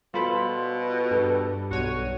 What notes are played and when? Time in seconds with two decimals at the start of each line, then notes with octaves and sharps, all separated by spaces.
0.14 B2 G3 F4 A4 C5 B5
1.11 G2 G3 A4
1.71 B1 F#4 C#5 D#7